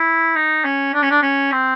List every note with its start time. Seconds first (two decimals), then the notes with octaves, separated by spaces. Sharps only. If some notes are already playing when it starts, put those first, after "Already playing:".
Already playing: E4
0.35 D#4
0.64 C#4
0.94 D4
1.02 C#4
1.10 D4
1.22 C#4
1.52 C4